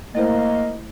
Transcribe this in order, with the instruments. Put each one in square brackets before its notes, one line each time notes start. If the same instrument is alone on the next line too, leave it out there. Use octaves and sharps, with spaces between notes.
[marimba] A3 E4 C5 [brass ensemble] A#3 [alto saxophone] D#5